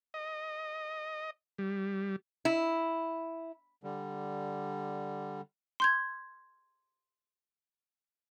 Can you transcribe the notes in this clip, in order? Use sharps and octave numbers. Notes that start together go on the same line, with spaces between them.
D#5
G3
E4
D3 G3
C6 G6 G#6